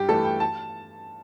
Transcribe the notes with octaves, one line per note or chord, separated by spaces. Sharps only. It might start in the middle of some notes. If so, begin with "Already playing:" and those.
Already playing: G2 G4
E3 A3 E4 A4
G5
A5